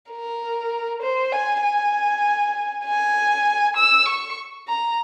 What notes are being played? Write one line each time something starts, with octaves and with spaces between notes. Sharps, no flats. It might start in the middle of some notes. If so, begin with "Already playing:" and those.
A#4
C5
G#5
G#5
G#5
E6
C#6
A#5